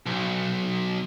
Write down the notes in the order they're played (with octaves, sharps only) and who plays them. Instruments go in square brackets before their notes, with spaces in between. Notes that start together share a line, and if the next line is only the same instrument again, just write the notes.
[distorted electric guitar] B1